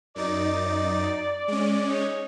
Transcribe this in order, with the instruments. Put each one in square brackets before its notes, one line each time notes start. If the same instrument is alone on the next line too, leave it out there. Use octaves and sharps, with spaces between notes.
[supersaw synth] F#2 D#4 A6 [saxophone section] D5
[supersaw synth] G#3 C#4
[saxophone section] D#4 C#5